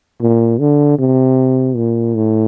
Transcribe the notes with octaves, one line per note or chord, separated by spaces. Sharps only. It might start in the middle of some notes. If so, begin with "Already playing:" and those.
A#2
D3
C3
A#2
A2